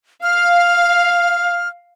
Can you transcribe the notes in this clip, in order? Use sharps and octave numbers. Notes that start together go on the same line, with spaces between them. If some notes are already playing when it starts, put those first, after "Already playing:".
F5 F6